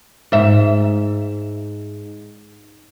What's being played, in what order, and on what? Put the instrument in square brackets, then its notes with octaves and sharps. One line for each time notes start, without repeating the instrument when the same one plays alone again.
[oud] G#2 E5